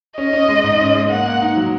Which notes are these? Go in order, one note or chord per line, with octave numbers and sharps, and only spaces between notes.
C#4 D#5
C#4
G#3
G#2
C#4
G#3
A#3 F#5
A#3
D#4
F#3